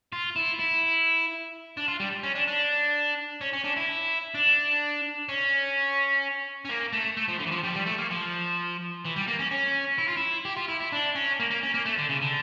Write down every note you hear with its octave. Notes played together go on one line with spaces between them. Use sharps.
F4
E4
E4
D4
F4
G3
C#4
D4
D4
C#4
C#4
D4
E4
D4
C#4
C#4
A#3
A3
A3
F3
D3
E3
F3
G3
F3
G3
A3
A#3
F3
E3
G3
A#3
C#4
C#4
E4
F4
E4
G4
F4
E4
E4
D4
C#4
A#3
A#3
C#4
A#3
A3
D3
C#3
D3